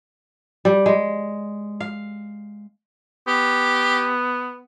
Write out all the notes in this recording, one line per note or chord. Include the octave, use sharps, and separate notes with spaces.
G3
G#3
F5
B3 G4